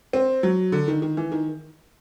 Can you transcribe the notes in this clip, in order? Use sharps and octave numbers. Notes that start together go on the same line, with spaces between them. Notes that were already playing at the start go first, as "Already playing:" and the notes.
C4
F#3
D3
D#3
D#3
E3
D#3